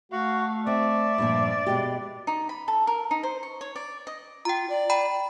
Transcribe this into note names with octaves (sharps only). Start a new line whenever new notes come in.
A3 F#4 F5
C4 D5 E5
G2 A#2 F3
B2 G#3 G4
D#4
B5
A4
A#4
D#4
C5
C#6
C#5
D5
D#5
F4 G5 A#5
D5
G5 A#5 B5